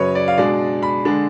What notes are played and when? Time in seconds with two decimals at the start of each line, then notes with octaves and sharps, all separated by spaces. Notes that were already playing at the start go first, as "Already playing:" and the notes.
Already playing: F#2 C#3 F#3 B4 C#5
0.15 D5
0.28 F5
0.38 B2 G#3 D4 D5
0.83 B5
1.05 D3 G#3 D4